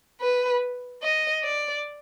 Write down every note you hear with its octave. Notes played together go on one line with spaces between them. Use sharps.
B4
D#5
D5